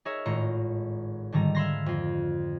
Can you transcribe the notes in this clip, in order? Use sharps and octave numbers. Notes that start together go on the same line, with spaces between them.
D#4 G#4 A#4 C#5 E5
G#1 A2 F4 A#5 C#7
G#2 D3 D#3 G3 A#5
E5 F5 B5 C6 G#6 A#6
F2 F4